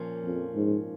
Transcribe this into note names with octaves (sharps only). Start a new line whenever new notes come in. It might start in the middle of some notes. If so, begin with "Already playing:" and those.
Already playing: A#2 F3 A#3 C#4
F2
G#2